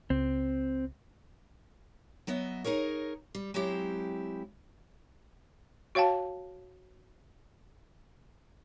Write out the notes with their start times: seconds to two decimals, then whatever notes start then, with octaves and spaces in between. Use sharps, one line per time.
0.10 C#2 C4
2.27 F#3 B3 D#5 E5
2.64 D#4 G#4 A#4 C#5
3.35 G3
3.54 F#3 G#3 C4 E4 G4
5.95 F#4 C#5 F5 G5 A5